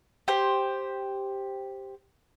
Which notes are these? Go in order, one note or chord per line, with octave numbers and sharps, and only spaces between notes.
G4 C5